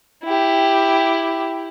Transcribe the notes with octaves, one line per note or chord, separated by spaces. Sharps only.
E4 G4